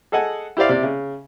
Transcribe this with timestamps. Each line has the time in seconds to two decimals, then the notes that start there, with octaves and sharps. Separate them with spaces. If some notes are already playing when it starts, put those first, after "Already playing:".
0.12 G#4 A4 D#5 F#5 G#5
0.57 E4 G4 C5 D5 F5
0.69 C3 D5 E5
0.83 C#3